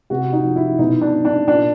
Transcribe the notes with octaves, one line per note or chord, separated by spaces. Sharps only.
C3 F#4
D#4
F3
E4
B2 D#4
D4
D4
A#2 D4